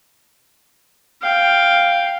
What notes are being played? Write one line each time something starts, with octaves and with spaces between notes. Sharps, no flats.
F5 G5